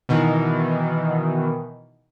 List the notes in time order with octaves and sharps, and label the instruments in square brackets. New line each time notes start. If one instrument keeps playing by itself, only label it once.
[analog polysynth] B2 D#3 E3